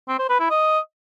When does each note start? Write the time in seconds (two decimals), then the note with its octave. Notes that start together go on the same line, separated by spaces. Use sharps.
0.08 C4
0.19 C5
0.29 B4
0.40 E4
0.50 D#5